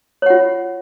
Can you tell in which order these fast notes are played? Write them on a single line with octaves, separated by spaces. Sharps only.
C#5 F#5 F4